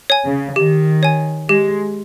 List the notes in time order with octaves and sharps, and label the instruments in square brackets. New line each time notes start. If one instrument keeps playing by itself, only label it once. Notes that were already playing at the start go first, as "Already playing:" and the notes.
[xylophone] C#5 G#5
[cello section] C#3
[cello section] D#3 [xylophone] G4
[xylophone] C#5 G#5
[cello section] G#3 [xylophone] G4